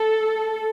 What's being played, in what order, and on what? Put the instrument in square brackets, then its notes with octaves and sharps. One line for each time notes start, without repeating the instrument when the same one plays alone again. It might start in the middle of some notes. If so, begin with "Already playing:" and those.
Already playing: [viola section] A4